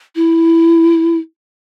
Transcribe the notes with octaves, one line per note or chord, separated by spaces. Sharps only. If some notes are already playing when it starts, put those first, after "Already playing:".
E4